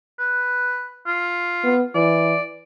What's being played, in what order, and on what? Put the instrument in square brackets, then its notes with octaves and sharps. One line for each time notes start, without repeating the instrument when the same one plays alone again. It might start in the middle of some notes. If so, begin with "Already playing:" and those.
[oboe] B4
F4
[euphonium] B3
[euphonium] E3 [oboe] D5